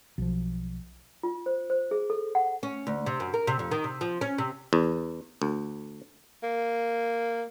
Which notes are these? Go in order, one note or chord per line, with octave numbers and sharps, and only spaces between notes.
B1 F3
F4
C5
C5
G#4
A4
F#5
C#4
D2
C3
F#2
A#4
C3
F2
D#3
C3
F3
C#4
C3
E2
D2
A#3